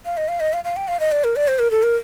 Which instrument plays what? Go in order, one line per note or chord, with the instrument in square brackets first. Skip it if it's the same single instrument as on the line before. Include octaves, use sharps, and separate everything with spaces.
[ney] F5
D#5
F5
D#5
F5
F5
G5
F5
D#5
D5
A#4
D5
C5
A#4
A4
A#4